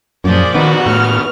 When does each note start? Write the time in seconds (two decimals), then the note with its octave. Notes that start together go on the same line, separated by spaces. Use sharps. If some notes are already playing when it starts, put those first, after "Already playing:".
0.24 F#2 A#2 F3 G#4 D5
0.55 D#2 D#3 B3 F#4
0.86 A2 F6